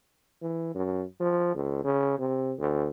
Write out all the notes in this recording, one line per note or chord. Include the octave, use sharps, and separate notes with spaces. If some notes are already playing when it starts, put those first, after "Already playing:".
E3
F#2
F3
C#2
C#3
C3
D2